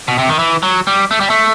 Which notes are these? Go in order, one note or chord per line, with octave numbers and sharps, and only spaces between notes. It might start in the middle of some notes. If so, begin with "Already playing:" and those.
B2
C3
D#3
E3
F#3
G3
A3
G3
A3